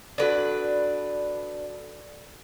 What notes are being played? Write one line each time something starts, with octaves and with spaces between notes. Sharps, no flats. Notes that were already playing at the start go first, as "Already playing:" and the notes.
D4 F#4 A4 B4 D5